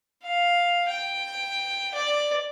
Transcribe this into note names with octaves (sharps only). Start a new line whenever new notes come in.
F5
G5
D5